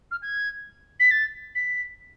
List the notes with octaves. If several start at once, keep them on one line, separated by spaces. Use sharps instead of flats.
F6
G#6
B6
A6
B6